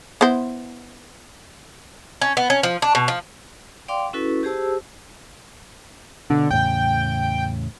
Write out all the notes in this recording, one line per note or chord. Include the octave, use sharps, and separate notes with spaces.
B3 E4 C5
C#4
B3
C#4
F3
D4
B2
F3
D5 F5 G5 C6 D6
C#4 E4 F#4 A4 B4
G4 G#4 C5 A5 E6
B2 D3
E2 A2 C#3 G5